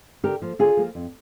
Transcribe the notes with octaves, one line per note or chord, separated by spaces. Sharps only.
D3 G4 A#4
F3 A#3
D3 F4 G#4
F3 A#3
F2